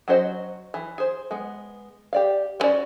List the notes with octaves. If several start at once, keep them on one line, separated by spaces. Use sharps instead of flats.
F#3 C#4 F#4 C5 D#5
E3
G#4 C5
G#3 B3
G4 D5 F5
B3 C#4 F#4 B4 D5